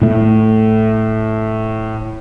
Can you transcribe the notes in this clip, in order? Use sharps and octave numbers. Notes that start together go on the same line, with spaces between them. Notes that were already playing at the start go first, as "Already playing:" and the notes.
A2 A3